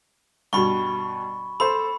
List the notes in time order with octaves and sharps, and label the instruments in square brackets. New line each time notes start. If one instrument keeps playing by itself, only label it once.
[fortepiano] G2 B2 [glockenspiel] B5 C#6
[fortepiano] A4 C5 [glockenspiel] B5